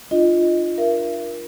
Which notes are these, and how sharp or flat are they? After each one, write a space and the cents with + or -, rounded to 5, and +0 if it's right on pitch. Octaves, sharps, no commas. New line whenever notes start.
D4 +40 F4 -5 D#5 +0
A#4 +20 E5 +40